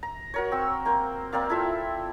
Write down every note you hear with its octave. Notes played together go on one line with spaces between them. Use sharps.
A#5
F#4 A#4 C#5
C4 C#6 E6
A#3 C5
A#3 C4 D5 F5
E4 F4 A4 E5